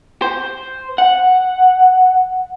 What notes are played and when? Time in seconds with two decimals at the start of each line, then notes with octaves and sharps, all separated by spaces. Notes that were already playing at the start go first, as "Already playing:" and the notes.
0.22 C5
0.98 F#5